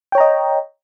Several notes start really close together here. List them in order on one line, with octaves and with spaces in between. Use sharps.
G5 C#5 A#5 D#5